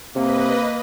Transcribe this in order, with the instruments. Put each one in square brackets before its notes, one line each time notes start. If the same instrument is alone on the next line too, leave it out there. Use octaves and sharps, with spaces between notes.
[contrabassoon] C3 [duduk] A#3 [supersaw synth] B4 D#5